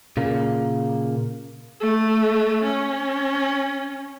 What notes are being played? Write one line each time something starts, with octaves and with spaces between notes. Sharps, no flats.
A#2 C#3 A#3
A3
C#4